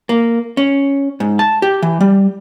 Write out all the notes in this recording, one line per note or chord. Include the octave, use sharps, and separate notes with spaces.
A#3
C#4
G#2
A5
G4
E3
G3